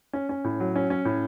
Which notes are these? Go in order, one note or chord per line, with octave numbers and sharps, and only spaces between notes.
C#4
C#4
A2
F#3
C#4
C#4
A2